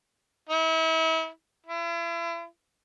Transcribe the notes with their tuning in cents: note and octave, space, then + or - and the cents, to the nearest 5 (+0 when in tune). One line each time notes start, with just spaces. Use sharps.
E4 -35
E4 +40